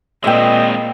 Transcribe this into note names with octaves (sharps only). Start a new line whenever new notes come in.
A#2 G#3 A#3 C4 D#5 E5 G5